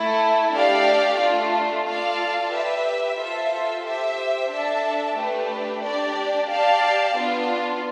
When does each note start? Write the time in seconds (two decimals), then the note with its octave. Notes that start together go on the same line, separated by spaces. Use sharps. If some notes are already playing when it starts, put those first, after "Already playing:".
Already playing: A3 E4 A4
0.54 A3 D4 G4 D5 F5
1.20 A3 D4 F4
1.86 F4 A4 D5 F5 A5
2.51 G4 B4 E5
3.18 F4 A4 C5 E5
3.84 G4 C5 E5
4.49 D4 A4 E5 A5
5.16 A3 D4 G4 B4
5.82 D4 G4 D5
6.48 G4 D5 F5 A5
7.15 B3 D4 F4